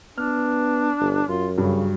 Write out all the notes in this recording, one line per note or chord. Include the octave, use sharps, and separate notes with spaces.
B3 D4 F6
G1
F#2 F4
G2 C#3 F#3